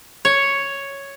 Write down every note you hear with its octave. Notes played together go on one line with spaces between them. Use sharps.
C#5